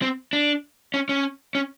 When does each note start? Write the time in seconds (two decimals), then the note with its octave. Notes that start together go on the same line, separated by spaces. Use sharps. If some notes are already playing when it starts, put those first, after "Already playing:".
0.02 C4
0.33 D4
0.94 C#4
1.09 C#4
1.55 C#4